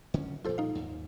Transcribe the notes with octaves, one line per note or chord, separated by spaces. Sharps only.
D3 C#4
A#2 F3 G3 F4 A4 C5
D#4 F5
D#2 G#2